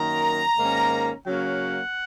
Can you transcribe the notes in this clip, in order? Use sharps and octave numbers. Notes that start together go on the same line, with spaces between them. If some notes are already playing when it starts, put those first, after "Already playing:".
Already playing: F#2 D#3 A#3 A#5
G#2 D#3 A#3 C#4
C#3 F#3 A#3 C#4 F#5